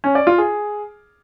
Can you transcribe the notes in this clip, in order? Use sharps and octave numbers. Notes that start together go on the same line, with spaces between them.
C#4
D5
F4
G#4